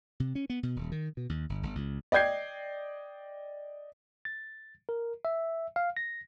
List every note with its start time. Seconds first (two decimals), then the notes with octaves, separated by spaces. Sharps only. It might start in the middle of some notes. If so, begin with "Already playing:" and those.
0.20 C3
0.35 C#4
0.50 B3
0.63 B2
0.76 D#1
0.92 D#3
1.17 B2
1.29 D#2
1.49 G1
1.63 G1
1.75 C#2
2.12 D5 D#5 G5 G6 G#6 C7
4.25 A6
4.89 A#4
5.25 E5
5.76 F5
5.97 A#6